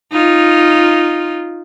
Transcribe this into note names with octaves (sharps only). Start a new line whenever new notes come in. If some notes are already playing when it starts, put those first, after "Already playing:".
D#4 F4